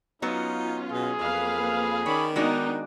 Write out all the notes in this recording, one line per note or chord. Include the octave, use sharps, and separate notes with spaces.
F#3 B3 C#4 D#4 F4
B2 G#4
F2 A#3 B4 F5
D#3 C#4 C#5 D5 B5
G#3 B3 D4 D#4 F#4 D5